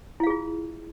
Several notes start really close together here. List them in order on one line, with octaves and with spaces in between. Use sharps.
E4 F5 G#4 F4